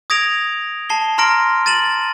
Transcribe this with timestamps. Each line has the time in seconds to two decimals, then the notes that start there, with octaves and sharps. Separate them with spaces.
0.10 D#6 G#6 A#6 D7 F7
0.90 A5 C7 G7
1.18 A#5 C6 F6 A#6 D7
1.66 A6 D#7 E7 F#7